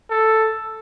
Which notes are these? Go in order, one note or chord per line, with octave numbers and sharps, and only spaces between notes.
A4